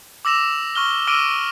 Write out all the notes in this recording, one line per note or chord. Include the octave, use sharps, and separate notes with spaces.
D6 E6 A#6 E7 F7
C#6 F6 G7
D6 E6 F6 A#6 D7 D#7